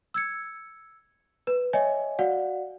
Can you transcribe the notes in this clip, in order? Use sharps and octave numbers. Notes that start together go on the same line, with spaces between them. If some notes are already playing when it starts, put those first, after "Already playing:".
E6 G#6 C#7
B4
C#5 D#5 E5 G#5
F#4 D5 F5 F#5